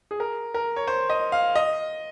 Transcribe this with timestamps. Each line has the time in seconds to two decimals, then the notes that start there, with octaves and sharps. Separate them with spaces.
0.11 G#4
0.20 A#4
0.54 A#4
0.76 C#5
0.87 C5
1.10 D#5
1.32 F5
1.56 D#5